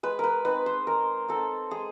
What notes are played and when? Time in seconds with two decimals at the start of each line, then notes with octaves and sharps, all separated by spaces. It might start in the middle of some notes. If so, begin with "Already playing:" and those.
0.03 G#3 B4
0.19 A#4 B4
0.45 C4 D#4 B4
0.66 C5
0.87 G#3 A#4
1.28 C4 D#4 A4
1.71 G#3 G#4